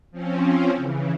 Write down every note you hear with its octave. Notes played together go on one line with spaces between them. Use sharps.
F3 C4 C#4
C#3 E3